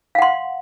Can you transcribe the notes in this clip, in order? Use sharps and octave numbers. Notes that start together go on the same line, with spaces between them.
F5 F#5 C6